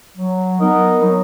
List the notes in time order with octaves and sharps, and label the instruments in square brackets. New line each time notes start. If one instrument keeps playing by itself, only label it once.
[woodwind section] F#3
B3 D#4 A#4 D#5
F#3